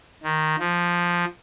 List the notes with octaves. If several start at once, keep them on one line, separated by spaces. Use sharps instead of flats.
D#3
F3